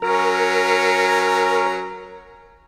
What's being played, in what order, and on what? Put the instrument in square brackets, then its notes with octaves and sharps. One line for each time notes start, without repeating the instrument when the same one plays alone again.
[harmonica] F#3 C#4 A#5 [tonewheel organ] A#4